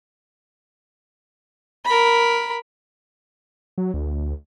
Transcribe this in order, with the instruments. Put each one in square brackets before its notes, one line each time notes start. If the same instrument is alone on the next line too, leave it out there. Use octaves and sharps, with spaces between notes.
[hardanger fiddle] A#4 B5
[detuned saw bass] F#3
D2